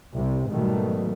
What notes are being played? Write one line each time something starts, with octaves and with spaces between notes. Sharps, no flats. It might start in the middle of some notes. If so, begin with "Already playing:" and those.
C2 C3
G#2 B2 D#3 F#3 G3 A3